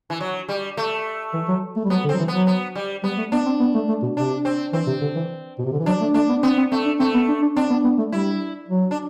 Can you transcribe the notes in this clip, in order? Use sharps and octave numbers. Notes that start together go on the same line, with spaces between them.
E3
F#3
G3
A3
E3
F#3
A3
G3
F#3 B3
D3
F#3 C4
E3
F#3 B3
B3
G3
G3 B3
A3
B3 D4
C4
B3
A3
A3
B2
C3 D4
C4
E3 C4
C3
D3
E3
B2
C3
D3
E3
F#3 D4
A3
A3 D4
B3
B3 C4
C4
A3 C4
D4
A3 C4
B3
D4
D4
C4 D4
B3
B3
A3
G3 E4
F#3
D4